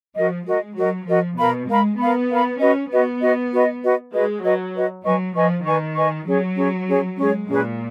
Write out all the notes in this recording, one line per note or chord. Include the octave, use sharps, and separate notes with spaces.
F3 F#4 A#4 D#5
G#3 F#4 A#4 D#5
F#3 F#4 A#4 D#5
F3 F#4 A#4 D#5
B2 A#4 F5 B5
G#3 A#4 F5 B5
B3 A#4 F5 B5
A#4 F5 B5
C#4 F#4 B4 D#5
B3 F#4 B4 D#5
F#4 B4 D#5
F#4 B4 D#5
F#4 B4 D#5
G#3 F#4 B4 D#5
F#3 F#4 B4 D#5
F#4 B4 D#5
F#3 B4 D#5 G#5 C#6
F3 B4 D#5 G#5 C#6
D#3 B4 D#5 G#5 C#6
B4 D#5 G#5 C#6
F#3 C#4 G#4 C#5
C#4 G#4 C#5
C#4 G#4 C#5
G#3 C#4 G#4 C#5
A#2 C#4 G#4 B4